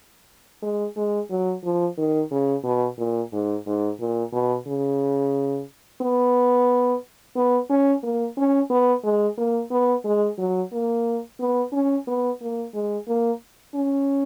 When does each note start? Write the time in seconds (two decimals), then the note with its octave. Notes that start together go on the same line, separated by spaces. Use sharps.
0.62 G#3
0.97 G#3
1.30 F#3
1.63 F3
1.98 D#3
2.31 C#3
2.64 B2
2.98 A#2
3.32 G#2
3.66 G#2
4.00 A#2
4.33 B2
4.67 C#3
6.02 B3
7.36 B3
7.70 C#4
8.03 A#3
8.37 C#4
8.70 B3
9.04 G#3
9.38 A#3
9.71 B3
10.05 G#3
10.38 F#3
10.72 A#3
11.40 B3
11.72 C#4
12.07 B3
12.41 A#3
12.74 G#3
13.08 A#3
13.74 C#4